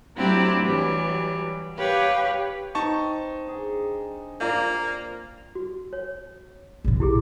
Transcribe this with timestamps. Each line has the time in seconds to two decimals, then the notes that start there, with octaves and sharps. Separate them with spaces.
0.17 F#3 A3 C4 D4 E4 G4
0.61 E3 F#3 G3
1.78 G4 B4 C#5 F5
2.75 C4 D#4 A5 C#6
3.47 D4 G#4
4.41 A#3 F4 D5 A#5
5.55 F#4
5.93 C#5
6.84 A#1 D3
7.00 E4 G4 G#4